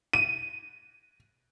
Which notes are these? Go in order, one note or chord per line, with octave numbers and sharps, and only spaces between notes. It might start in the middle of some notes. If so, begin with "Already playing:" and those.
D#7